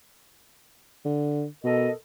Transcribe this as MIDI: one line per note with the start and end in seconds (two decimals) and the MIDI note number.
1.05 1.46 50
1.64 1.89 47
1.64 1.91 69
1.64 1.91 70
1.64 1.91 75